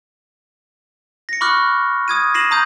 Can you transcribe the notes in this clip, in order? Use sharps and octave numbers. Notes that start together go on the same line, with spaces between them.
A#6 C#7
B5 C#6 D6 F6 F#6
D#6 G#6 D#7
A#6 C7 D#7 E7 F#7
A#5 D#6 G6